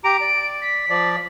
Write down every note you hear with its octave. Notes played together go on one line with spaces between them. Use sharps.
G4 A#5 D7
D5
B6
F3 D5